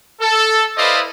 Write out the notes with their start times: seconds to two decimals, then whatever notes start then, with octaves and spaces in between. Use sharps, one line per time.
0.20 A4
0.77 E4 B4 C5 D5 D#5 F5